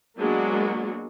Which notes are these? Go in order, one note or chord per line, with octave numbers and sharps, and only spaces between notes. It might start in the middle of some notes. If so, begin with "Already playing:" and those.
F#3 G#3 A#3 B3 D4 F#4